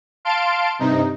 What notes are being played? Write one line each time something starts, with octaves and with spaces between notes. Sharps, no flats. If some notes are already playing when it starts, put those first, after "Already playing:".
F5 A5 C6 D7
G2 C3 D#4